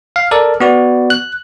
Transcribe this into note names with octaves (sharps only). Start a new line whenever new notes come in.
F5
A4 A#4 D5
B3 F#4 D5
F#6